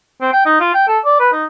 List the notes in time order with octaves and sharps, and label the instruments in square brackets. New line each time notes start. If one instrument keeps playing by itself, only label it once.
[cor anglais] C4
G5
D#4
F4
G5
A4
D5
B4
D#4